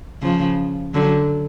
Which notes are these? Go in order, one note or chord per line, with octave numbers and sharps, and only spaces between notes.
C#3 F3
D3 F#3